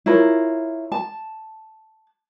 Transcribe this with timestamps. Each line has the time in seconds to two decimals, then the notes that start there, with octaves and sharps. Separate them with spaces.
0.06 E4 F4 A#4 C#5
0.92 A5